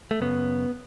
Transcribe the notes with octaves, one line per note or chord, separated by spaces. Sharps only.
A3
F#2 C#3 B3